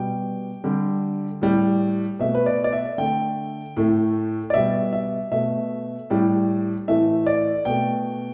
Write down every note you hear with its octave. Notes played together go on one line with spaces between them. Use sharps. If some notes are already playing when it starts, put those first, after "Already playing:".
Already playing: B2 G3 G5
D3 G3
A2 G3
B2 A3 E5
B4
D5
D5
E5
D3 A3 G5
A2 A3
D5
B2 G3 E5
E5
B2 A3 E5
A2 G3
A2 E3 A3 E5
D5
B2 A3 G5